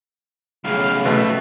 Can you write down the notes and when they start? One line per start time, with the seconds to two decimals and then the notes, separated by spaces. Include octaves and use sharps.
0.65 B1 A2 C#3 F5
1.05 B2 A3 E5